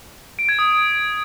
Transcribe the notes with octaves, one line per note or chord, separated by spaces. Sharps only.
D7
G#6
D#6